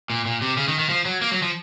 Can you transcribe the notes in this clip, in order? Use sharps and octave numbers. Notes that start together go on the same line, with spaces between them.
A#2
A#2
C3
C#3
D#3
D#3
F3
F#3
A#3
F#3
F3